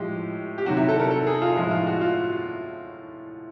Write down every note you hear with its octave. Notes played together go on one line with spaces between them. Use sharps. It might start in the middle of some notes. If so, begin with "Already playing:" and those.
Already playing: A2 F3 G#3 G4
G4
C3 D#3 F#3 F#4
E4
A4
A#4
A4
G#4
F4
A2 F3 G#3 E4
F4
F#4
F4